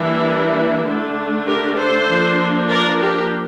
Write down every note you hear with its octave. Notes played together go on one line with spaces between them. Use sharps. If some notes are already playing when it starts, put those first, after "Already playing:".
Already playing: E3 G3 A#3 D4 E4
D3 A3 D4
G4 A#4
A4 C5
F3 A#3 D4
A#4 D5
G4 A#4